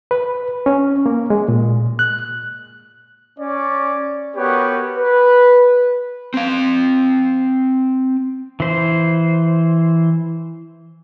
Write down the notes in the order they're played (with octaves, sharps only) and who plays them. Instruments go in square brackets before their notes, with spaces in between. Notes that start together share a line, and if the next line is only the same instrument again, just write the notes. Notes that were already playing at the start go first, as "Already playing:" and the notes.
[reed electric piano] B4
C#4
A#3
G#3
A#2
F#6
[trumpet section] C#4 D5
B3 F#4 G4 A#4 B4 C#5
B4
[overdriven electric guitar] C4 F5
[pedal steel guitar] E3 C5